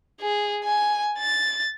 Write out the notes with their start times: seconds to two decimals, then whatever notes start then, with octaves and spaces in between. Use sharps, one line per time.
0.21 G#4
0.64 G#5
1.19 A6